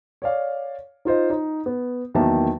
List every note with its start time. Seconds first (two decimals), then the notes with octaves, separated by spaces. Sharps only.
0.22 C#5 D5 F5
1.05 D#4 F4 C5 D#5
1.30 D#4
1.66 B3
2.15 E2 D#3 F#3 A#3 E5 A5